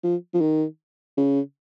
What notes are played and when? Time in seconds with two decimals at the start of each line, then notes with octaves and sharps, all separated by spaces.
0.04 F3
0.34 F3
0.41 D#3
1.17 C#3